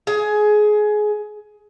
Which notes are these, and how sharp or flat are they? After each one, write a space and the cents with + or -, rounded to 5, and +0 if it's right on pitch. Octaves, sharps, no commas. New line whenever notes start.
G#4 +20